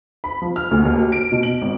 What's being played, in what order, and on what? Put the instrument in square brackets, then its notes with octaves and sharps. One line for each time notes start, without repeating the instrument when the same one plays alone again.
[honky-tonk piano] B5
F3
F6
D2
D#2
F#4
D7
B2
F#7
G#1